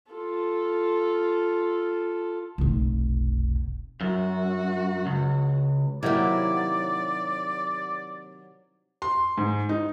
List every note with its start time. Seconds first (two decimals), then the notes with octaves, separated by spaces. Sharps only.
0.12 F4 A4
2.58 F1 B1
4.01 F#2 F#4
5.06 C#2
6.03 C3 D#3 F#3 A#3 E4 G4 D5
9.02 C6
9.38 G#2
9.69 D#4